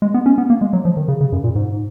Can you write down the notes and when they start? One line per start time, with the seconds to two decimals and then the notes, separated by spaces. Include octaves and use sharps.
0.02 G#3
0.14 B3
0.26 C#4
0.38 B3
0.50 A#3
0.61 G#3
0.73 F#3
0.85 F3
0.97 D#3
1.08 C#3
1.21 C#3
1.32 F#2
1.44 A#2
1.55 G#2